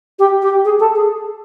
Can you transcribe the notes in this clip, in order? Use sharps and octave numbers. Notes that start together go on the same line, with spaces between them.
G4
G4
G#4
A4
G#4